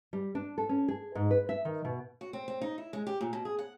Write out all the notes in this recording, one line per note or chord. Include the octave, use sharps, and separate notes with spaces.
G3
D4
A4
C#4
G#4
G#2
B4
E5
D#3
B2
F#4
C4
C4
D#4
E4
G#3
G4
A#2
B2
G#4
F#5